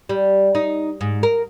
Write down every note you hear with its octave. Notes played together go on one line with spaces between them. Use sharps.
G3
D#4
G#2
A#4